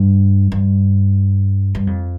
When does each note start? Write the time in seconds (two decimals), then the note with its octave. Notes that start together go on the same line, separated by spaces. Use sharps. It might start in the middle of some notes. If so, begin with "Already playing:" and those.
Already playing: G2
0.52 G2
1.75 G2
1.87 F2